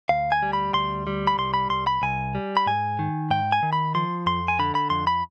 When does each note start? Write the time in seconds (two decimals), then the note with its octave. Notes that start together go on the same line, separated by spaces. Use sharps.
0.09 D2 F5
0.32 G#5
0.42 G3
0.53 B5
0.73 D2 C6
1.07 G3
1.27 B5
1.38 C2 C6
1.54 B5
1.70 C2 C6
1.87 B5
2.02 C2 G#5
2.35 G3
2.57 B5
2.66 G#2 G#5
2.99 D#3
3.30 G#2 G5
3.52 G#5
3.63 D#3
3.73 B5
3.95 F3 C6
4.26 F2 C6
4.48 G#5
4.59 D3 B5
4.75 B5
4.90 F2 C6
5.07 B5